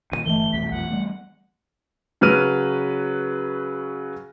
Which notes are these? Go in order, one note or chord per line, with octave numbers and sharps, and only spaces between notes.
G2 A#2 D#3 D#7
G1 E3 A3 G7
C2 F2 B2 B6
B1 F2 F3 F#5
G3 A3 B3
C#3 F#3 B4 F6 D#7